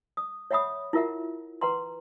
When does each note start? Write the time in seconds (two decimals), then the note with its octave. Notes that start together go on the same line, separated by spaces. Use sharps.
0.17 D#6
0.51 C#5 E5 F#5 B5 D#6
0.93 E4 F4 A#4 E5 F#5
1.61 B4 F#5 A#5 C6